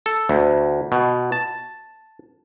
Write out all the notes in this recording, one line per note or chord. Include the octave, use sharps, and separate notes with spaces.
A4
D2
B2
A5